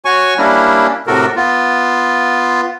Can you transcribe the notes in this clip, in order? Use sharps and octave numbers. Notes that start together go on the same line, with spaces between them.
F#4 C#5 G#5 C#6
G3 A#3 C#4 D4 E4
A2 C3 F#4 A4 A#4
B3 F4